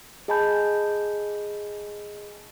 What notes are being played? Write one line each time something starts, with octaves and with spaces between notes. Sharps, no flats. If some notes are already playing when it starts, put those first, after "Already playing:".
G#4 D#5 G#5 A5 B5 G6